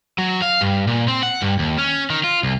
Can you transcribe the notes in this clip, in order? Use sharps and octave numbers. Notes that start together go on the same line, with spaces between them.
F#3
F5
G2
A#2
C4
F#5
G2
D#2
C#4
D#3
F4
C2